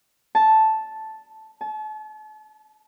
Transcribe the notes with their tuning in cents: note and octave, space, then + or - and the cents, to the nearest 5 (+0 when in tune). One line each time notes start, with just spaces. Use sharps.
A5 -5
A5 -40